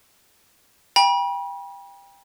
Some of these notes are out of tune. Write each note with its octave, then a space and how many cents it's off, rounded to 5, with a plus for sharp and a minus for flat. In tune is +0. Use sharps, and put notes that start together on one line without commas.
G5 +25 B5 -40